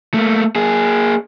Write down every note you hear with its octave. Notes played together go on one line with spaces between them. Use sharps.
A3 A#3
A#3 G#4